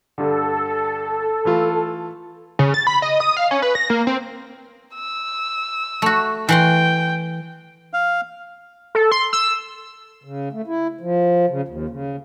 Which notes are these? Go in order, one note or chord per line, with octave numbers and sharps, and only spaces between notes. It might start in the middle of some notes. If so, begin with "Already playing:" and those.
G2 D3 A4
E3 A3 F4
C#3
A6
B5
D#5
D#6
F5
C#4
B4
A#6
A#3
C4
E6
A3 F#4
E3 F#5 G5 C6
F5
A4
C6
E6
C#3
A3
E4
F3
C#3
D#2
C#3